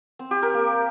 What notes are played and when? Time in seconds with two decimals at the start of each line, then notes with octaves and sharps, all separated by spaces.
0.19 C4
0.31 G4
0.43 A#4
0.54 A#3